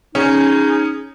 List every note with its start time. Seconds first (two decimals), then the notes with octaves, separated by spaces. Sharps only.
0.15 C#4 D#4 G#4